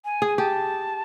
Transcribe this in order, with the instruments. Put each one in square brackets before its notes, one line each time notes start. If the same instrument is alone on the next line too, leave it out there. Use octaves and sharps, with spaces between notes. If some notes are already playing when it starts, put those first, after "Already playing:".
[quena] G#5
[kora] G#4
[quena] G#5
[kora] G4 [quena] A5